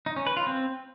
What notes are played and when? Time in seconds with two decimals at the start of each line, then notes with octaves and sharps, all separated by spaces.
0.06 D#4
0.16 C#4
0.27 B4
0.37 F4
0.47 C4